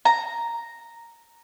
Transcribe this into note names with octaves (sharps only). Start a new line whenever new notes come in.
A#5